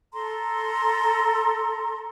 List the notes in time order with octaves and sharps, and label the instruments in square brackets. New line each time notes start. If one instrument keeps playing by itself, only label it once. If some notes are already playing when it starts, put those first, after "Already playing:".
[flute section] A4 A#5 C6